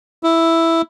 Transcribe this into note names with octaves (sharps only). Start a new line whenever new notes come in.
E4